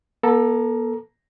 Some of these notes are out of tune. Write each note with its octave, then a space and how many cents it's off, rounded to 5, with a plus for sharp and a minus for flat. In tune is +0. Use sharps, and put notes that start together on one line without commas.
B3 -45 A4 +5 A#5 +15